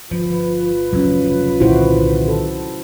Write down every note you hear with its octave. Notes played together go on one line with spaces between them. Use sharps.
G1 F3 F4 B4
F1 C#2 F#3 C#4
C2 A#2 D3 D#3 E4 F#4 C5
A4